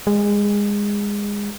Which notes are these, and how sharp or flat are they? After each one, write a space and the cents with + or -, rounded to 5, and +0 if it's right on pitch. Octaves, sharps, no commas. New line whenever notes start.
G#3 -20